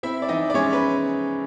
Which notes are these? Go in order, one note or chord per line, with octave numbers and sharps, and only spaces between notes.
C4 E4 E5
D5
E3 D#4 D#5
D5
G#3 C#4 C#5
B4